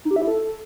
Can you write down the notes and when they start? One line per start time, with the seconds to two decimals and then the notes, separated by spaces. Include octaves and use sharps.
0.05 D#4
0.11 G4
0.16 E5
0.22 E4
0.27 A4